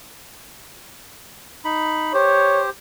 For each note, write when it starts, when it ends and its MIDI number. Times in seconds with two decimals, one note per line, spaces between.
1.65 2.13 63
1.65 2.13 83
2.14 2.70 67
2.14 2.70 72
2.14 2.62 73